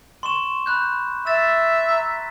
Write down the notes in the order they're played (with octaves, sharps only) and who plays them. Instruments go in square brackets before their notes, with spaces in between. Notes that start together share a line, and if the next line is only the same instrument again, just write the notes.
[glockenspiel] C6 C#6 E7
B5 F#6 G6
[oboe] E5 [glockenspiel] A6 E7
[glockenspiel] A#5 B6